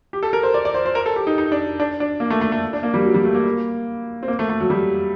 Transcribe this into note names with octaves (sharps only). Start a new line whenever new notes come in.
G4
A4
A#4
C5
D5
D5
C5
C5
A#4
A4
G4
D#4
D#4
D4
D4
D4
A#3
A3
A3
A3
D4
A#3
G3
F#3
G3
A3
A#3
C4
A#3
A3
A3
F#3
G3